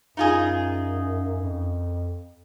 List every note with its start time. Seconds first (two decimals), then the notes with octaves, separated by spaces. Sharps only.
0.17 F#2 D#4 F4 G#4
1.41 F2